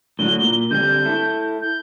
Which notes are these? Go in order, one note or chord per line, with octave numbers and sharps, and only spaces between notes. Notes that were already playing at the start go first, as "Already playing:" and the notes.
A2 D3 F#3 G7
A#2
D3 G3 C4 G6
E4 A4
G6